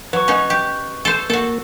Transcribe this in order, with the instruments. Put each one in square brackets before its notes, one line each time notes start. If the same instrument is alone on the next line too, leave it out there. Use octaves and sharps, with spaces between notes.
[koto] F#3 [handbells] B4 C#6
[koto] C#4 D#4 F#4
G4
A4 C5
[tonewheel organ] A#3 [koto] F#4 A4